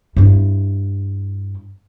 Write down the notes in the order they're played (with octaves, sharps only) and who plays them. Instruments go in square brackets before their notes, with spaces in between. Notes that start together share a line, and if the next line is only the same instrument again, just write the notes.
[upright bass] G2 E4